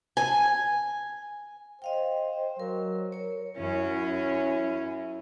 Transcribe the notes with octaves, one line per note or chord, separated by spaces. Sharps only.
G#5
C5 D#5 F5 G5
F#3 A#4
A#4 C#5
F#2 C#4 E4